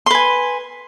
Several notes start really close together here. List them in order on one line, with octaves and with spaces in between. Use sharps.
C6 B4 G#5